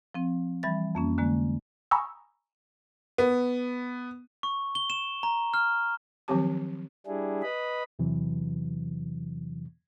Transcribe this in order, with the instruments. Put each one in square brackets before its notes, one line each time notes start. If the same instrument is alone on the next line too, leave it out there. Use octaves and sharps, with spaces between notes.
[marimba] F3 C4
E3 G3 E5 B5 A6
F2 A#3 C#4
D3 G#3 A#3
[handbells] G#5 A#5 B5 C#6 D#6 E6
[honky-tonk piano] B3
[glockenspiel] C#6
G7
E7
A#5
F6
[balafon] D#3 F3 F#3 C4 G4 A5
[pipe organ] G3 D4 E4 G#4
B4 D#5 B5
[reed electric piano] E2 C3 E3 F#3